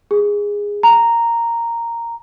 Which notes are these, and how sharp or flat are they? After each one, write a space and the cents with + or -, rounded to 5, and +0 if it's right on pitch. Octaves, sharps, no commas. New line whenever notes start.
G#4 -15
A#5 -5